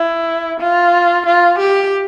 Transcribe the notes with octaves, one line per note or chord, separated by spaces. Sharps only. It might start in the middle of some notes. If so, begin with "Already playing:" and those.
Already playing: E4
F4
F4
G4